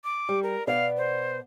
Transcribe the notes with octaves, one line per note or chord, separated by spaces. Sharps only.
D6
G3
A#4
B2 B3 D5 F5
C5